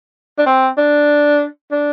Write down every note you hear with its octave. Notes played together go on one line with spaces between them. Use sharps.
D4
C4
D4
D4